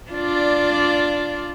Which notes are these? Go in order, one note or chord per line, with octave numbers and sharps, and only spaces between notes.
D4 F4 D5